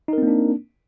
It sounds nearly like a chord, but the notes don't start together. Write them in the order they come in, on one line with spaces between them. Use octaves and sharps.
D#4 A#4 C4 A#3 D4